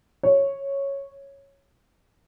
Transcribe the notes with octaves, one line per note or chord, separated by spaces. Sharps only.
C#5